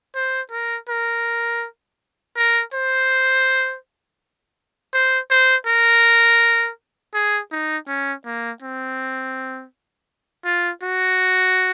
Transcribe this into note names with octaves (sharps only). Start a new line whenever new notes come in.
C5
A#4
A#4
A#4
C5
C5
C5
A#4
G#4
D#4
C#4
A#3
C4
F4
F#4